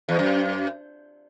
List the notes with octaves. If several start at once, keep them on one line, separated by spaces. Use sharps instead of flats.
E2
F#2